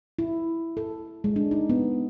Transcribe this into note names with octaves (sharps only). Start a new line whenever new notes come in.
E4
A4
G#3
D4
D#4
B3